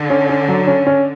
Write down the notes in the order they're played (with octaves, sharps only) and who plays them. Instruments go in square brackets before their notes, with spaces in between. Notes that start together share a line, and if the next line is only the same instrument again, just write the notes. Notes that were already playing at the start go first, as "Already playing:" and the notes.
Already playing: [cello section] D3
[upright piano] C#4
C#4
F#3
C#4
C#4